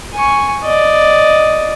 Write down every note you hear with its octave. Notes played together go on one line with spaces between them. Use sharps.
G#5 C#6
D5 D#5